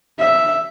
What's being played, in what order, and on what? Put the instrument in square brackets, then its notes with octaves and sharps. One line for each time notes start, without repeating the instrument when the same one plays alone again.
[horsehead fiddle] E5